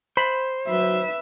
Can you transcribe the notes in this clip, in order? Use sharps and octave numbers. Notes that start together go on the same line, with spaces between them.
C5 B5
F#3 B4 E5